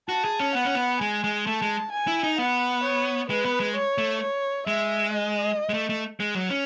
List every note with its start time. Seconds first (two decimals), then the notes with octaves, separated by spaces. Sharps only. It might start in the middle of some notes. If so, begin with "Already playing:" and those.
0.09 F#4 A5
0.25 G#4
0.40 C#4
0.55 B3 F#5
0.65 C#4
0.75 B3
1.01 G#3 G#5
1.24 G#3
1.47 A3 A5
1.62 G#3
1.92 G#5
2.08 E4
2.23 D#4
2.38 B3 F#5
2.84 C#5
3.30 G#3 B4
3.45 B3
3.60 G#3
3.75 C#5
3.98 A3
4.21 C#5
4.67 G#3 E5
5.13 D#5
5.69 G#3
5.74 A3
5.89 A3
6.20 G#3
6.35 F#3
6.50 C#4